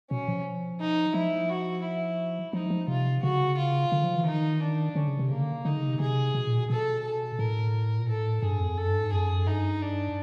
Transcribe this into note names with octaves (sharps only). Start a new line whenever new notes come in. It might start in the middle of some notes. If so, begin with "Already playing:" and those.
B2 C#4
F3
D#4
F3 E4
F#4
E4
F3 D#4
F3
C3 F4
C#3 F#4
F4
D3
F3
E3
D#3 D#4
D4
D3 C#4
C#3
C3
C#3 A#3
D3
D3 D#4
C#3
C3
C3 G#4
B2
A#2
B2
B2 A4
A4
A2 A#4
A#2
A2 A4
G2 G#4
F2
F#2 A4
G2
G#2
F#2 G#4
G2 D#4
D4